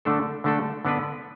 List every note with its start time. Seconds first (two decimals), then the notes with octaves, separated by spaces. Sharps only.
0.05 D3 A3 D4 A4
0.44 D3 A3 D4 A4
0.85 D3 B3 D4 B4